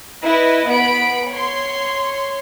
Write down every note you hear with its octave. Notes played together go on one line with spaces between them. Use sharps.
E4 B4 D#5
B3 B5 D7
C#5 C6